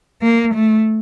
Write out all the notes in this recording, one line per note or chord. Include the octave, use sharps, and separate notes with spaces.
A#3
A3